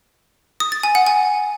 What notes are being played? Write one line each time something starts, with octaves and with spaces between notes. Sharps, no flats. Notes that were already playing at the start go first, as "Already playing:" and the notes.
D#6
A6
G#5
F#5
G#5